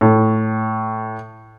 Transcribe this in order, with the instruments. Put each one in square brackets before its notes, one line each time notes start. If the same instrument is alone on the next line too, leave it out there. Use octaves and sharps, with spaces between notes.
[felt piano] A2